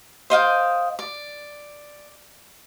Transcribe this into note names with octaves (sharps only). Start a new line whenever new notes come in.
C5 D#5 F5 G5
D5